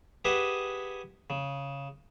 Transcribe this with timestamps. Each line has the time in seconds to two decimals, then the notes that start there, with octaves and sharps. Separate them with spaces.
0.25 G4 G#4 B4 D#5 E5 F#5
1.30 C#3